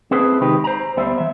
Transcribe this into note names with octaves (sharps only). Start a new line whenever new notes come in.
C4 E4 G#4 A4 B4 C5
C3 D#3 G#3 D#4 G4 B4
C5 A#5
D2 G3 B3 C5 E5
E3 E5